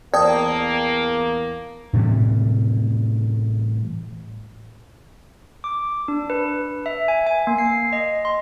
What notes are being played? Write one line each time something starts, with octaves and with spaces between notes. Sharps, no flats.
E2 A#3 D5 G5 A5 D#6
A2 C3 E3 G3
D6
D4
B4
E5
G#5
G#5
A#3
C7
D#5
C6